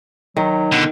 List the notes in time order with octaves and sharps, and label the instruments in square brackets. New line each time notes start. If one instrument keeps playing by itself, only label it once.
[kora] D#3 [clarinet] F#3
[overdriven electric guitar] B2 D3